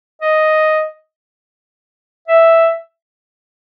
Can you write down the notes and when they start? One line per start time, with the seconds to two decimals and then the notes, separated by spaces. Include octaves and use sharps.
0.22 D#5
2.28 E5